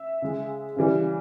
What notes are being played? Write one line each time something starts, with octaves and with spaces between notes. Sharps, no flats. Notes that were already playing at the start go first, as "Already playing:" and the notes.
Already playing: E5
C#3 G#3
C#3 E3 G3